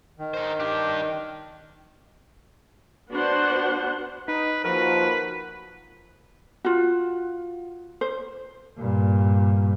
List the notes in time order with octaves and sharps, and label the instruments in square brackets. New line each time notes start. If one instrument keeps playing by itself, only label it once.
[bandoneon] D#3
[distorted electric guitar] D#4 C5
D4 G4
[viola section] B3 D4 F#4 C5 F#5
[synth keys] D#4 [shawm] B4
[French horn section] D#2 D#3 F3 [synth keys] F#4 A#4 [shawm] B4
[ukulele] F4 F#4
C5
[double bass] G2 A#2